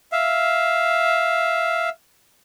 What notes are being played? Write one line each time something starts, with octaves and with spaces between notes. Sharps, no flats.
E5 F5